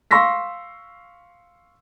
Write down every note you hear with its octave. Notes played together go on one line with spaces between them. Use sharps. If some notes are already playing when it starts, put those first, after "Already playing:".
F5 C6 C#6 E6 A#6 B6